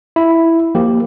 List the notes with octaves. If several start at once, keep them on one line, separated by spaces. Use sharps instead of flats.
E4
F3 A#3 G4